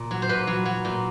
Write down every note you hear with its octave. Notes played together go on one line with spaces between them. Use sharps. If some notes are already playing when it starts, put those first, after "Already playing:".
Already playing: A#2
F#3
C5
A#2 B4
F#3
F#3
A#2